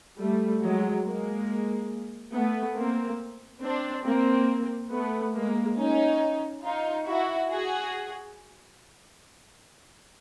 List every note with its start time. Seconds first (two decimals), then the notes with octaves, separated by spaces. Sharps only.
0.19 G3 A3
0.62 F#3 G#3
1.05 G#3 A#3
2.34 A3 B3
2.76 A#3 C4
3.63 C4 D4
4.06 A#3 C4
4.91 A3 B3
5.35 G#3 A#3
5.78 C#4 D#4
6.63 D#4 F4
7.06 E4 F#4
7.49 F#4 G#4